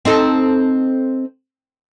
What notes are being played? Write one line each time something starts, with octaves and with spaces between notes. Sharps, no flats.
C4 D#4 A4